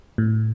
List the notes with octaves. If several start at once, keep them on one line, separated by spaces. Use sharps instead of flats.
A2